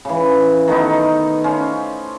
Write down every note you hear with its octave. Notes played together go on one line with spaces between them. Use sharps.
C#3 E3
D#3 A3 B3 D#4
C#4 F4 C5